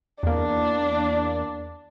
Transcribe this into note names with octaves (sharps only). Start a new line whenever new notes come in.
E2 A#3 D4